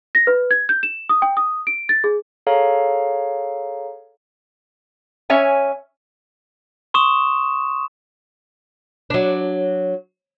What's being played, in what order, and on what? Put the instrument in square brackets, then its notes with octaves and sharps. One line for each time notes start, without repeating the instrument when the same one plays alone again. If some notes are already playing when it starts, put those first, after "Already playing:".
[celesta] A#6
B4
G#6
G6
E7
D#6
G5
D#6
D7
A6
G#4
[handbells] G#4 A4 C#5 F5 A#5
[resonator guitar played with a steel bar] C#4 C#5 E5 G#5
[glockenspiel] C6 C#6 D#6 E7
[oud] F#3 D4